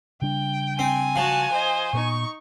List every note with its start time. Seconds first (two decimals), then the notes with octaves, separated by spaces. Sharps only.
0.22 C#3 G3 D4 G5
0.79 C4 G#5
1.16 F3 F#4 A5
1.52 C5 D#5
1.93 A#2 B3 D#4 C#6